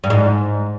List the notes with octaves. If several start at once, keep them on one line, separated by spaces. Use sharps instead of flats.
G2
G#2